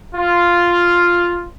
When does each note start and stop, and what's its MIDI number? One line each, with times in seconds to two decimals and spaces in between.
0.15 1.46 65